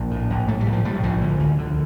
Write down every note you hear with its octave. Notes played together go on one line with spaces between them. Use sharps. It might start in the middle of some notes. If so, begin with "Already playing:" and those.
Already playing: A#1 A#3
A2
A#1
A2 A3
G3
A#1
F3
A2 G3
A#1 F3
D3
D2
D3